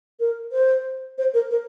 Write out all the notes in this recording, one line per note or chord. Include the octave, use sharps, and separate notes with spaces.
A#4
C5
C5
A#4
A#4